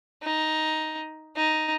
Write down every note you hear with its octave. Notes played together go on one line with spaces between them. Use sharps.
D#4
D#4